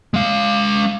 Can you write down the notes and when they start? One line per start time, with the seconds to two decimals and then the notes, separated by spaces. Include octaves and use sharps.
0.14 G#3 F5